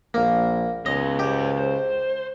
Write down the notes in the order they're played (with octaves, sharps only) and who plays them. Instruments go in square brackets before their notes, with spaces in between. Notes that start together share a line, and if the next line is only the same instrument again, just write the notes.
[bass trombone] A#1 [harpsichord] A#3
[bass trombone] C#2 [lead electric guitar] B3 C#5 [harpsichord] D#5
[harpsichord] G4 [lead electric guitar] C5 D#5
[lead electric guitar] C5